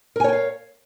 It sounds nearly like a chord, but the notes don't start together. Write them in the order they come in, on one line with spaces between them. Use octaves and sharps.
A#4 G#5 C#5 G5 F5